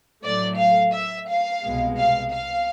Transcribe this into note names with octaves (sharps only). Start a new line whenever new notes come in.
A2 F#3 A3 D5
F5
E5
F5
C2 B2 G#3
F5
F5